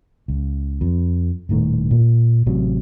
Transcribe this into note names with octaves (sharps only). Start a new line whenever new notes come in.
C#2
F2
D#1 A2 D#3 A3
A#2
A1 C3 F#3